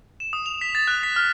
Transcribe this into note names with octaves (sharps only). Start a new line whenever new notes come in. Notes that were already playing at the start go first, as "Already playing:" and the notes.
E7
D#6
F7
B6
A6
F#6
B6
F6